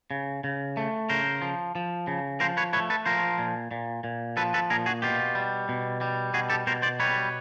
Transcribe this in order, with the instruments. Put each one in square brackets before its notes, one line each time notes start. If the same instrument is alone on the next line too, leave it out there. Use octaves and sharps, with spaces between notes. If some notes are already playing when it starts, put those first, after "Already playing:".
[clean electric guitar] C#3
C#3
A3
C#3 A#4 C5
F3
F3
C#3
F3 A#4 C5
B4 C#5
A3 B4 C#5
A4 B4
F3 A#4 C5
A#2
A#2
A#2
F3 A4 B4
A4 B4
A#2 G#4 A#4
F#4 G#4
B2 F4 G4
G3
B2
G3
B2 F#4 G#4
G4 A4
B2 A#4 C5
C5 D5
G3 B4 C#5